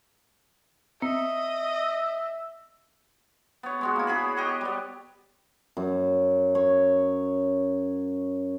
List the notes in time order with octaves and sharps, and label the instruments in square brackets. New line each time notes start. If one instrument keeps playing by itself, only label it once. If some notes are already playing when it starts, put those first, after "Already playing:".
[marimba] C4 [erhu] D#5 [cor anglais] E5
[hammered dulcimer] B3 C#5
G#3 B3 F#4
A#3 E4
B3 E4 G#4 B5
G4 D#5 F#5
G3 B3
F#2
C#5